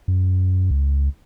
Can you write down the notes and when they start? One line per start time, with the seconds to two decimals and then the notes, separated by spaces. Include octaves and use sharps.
0.08 F#2
0.71 C#2